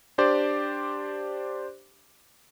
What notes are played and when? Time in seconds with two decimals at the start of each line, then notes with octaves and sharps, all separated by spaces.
0.18 D4 G4 C5 D5